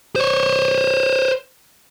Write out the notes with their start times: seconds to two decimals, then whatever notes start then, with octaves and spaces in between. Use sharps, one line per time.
0.16 C5 C#5